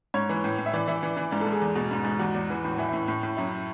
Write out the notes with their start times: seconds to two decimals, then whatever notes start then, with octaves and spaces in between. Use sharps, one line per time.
0.14 G#2 C#5
0.29 E3
0.44 A2
0.59 A2
0.66 E5
0.73 E3 D5
0.87 E3 E5
1.02 E3 D5
1.17 E3
1.31 G#2 D5
1.41 A4
1.46 G#2
1.52 G#4
1.62 E2
1.75 B2
1.91 G#2
2.05 G#2
2.19 E2 F#4
2.35 E2
2.50 E3
2.64 A2
2.78 E3 E4
2.88 E4
2.93 A2
3.08 A2
3.23 A2
3.37 F#2 E4